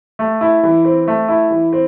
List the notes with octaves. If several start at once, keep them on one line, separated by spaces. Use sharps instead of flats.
A3
E4
E3
C4
A3
E4
E3
C4